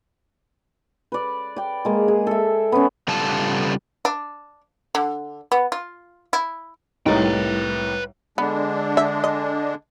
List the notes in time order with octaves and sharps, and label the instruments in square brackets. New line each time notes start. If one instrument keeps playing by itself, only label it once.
[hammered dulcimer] B4 D5
D5 G5
G#3 A#3
G#4
A4 E5
B3 C#4
[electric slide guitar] C#3 G3 B3 F4 A4 A5
[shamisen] D4
D3
B3
F4
E4
[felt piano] C2 A2 [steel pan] D#4 [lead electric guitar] B4 G5
[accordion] D3 G#3 D4 [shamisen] B3
[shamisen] E5
D#5